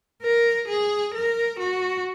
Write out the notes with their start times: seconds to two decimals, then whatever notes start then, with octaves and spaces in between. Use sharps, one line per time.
0.22 A#4
0.68 G#4
1.14 A#4
1.59 F#4